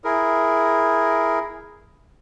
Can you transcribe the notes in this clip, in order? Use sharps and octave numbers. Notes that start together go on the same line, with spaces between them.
E4 G#4 A#4